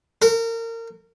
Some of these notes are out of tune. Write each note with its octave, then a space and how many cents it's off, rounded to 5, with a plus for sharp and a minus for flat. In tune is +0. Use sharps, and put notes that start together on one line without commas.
A#4 -30